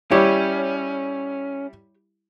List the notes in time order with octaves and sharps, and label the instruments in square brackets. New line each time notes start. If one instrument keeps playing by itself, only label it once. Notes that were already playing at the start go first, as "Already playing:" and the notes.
[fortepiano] G3 E4 [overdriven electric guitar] C#4 [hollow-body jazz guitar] G4 C#5